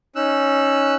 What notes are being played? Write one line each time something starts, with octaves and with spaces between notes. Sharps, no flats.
C#4 D#4 E6 F#6